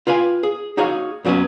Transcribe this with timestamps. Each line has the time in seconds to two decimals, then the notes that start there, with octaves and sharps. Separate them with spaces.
0.07 F4 B4 F5 G5 G#5
0.43 G#4
0.77 D#4 F#4 G#4 C#5 F5
1.25 F#2 E3 F#3 B3 C#4 D#5